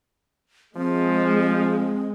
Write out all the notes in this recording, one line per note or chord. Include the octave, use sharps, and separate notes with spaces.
F3 G#3 C4